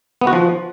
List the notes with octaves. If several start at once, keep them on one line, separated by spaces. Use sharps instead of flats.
B3
F#4
F3